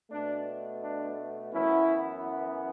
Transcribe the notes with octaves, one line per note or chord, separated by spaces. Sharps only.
B2 A3 D4
D4
F#2 E3 B3 C#4 E4